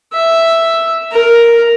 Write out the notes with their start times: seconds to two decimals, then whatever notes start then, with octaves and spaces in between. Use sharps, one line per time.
0.14 E5
1.12 A#4